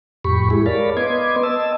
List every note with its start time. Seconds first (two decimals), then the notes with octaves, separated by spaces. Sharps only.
0.25 F2 A2 G4 B5 C#6
0.50 G#3 E4 G#4
0.66 A#4 C#5 D5 F5 A5 B5
0.97 B3 B4 D#5 C6 D6 G#6
1.43 D#5 A5 E6